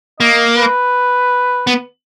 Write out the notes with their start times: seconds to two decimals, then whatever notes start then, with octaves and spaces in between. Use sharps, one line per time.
0.20 A#3 D#5
0.57 B4
1.67 B3